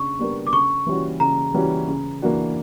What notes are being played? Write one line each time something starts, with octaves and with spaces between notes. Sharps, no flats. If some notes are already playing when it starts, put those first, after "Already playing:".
Already playing: C#3 D4 C#6
G3 B3 D4 A#4
D6
C#3 C#6
E3 G3 C#4 F#4
C#3 A#5
E3 G3 C#4 F#4
C#3
E3 A#3 D4 F#4